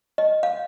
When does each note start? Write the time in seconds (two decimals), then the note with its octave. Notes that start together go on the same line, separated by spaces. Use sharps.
0.18 D#5
0.43 F5